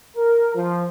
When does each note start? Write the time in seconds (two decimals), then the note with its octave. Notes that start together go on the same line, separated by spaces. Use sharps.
0.17 A#4
0.55 F3